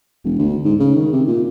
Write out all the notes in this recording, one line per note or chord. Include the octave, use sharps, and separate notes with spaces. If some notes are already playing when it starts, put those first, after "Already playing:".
E1
D2
G#2
C#3
D#3
C3
A#2